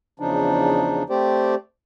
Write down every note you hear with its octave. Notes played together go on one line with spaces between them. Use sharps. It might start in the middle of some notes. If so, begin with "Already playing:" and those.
E2 C#3 F3 D4 D#4
A3 C4 G4 C5 D5